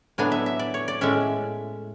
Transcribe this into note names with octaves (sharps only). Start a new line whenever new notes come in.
A2 F#3 B3 D4 G#5
E5
E5
D5
C#5
D5
A2 G#3 C#4 E5